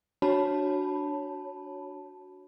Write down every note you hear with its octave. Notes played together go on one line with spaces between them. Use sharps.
D4 F#4 C#5 A5 B5